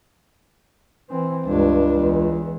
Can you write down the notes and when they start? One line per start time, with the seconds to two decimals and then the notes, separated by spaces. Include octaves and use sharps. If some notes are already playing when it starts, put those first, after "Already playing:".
1.10 E3 C4
1.46 C#2 G2 D4
1.99 E2